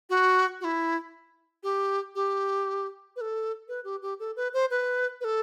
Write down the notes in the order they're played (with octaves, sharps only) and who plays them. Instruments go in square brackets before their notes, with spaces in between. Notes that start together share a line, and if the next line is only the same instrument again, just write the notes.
[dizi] F#4
F#4
E4
G4
G4
B4
A4
B4
G4
G4
A4
B4
C5
B4
B4
A4